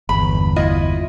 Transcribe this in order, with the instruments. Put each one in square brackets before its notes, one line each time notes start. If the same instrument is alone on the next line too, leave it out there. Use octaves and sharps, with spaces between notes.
[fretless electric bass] G1 E2 [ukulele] B5
[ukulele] E4 F4 D#5